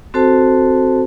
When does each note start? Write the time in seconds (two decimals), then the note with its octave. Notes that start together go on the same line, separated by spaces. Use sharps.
0.14 C4 F#4 A4 C5 A5